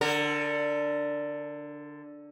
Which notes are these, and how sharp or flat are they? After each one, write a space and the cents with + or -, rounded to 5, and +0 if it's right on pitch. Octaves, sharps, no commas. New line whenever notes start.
D3 +0 A#4 -30